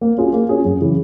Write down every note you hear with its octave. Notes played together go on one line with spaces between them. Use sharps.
A#3
C#4 F4 G#4
A#3
C#4 F4 G#4
F#2
C#3 E3